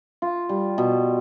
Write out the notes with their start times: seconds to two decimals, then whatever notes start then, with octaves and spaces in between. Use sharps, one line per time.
0.22 F4
0.49 G3
0.78 B2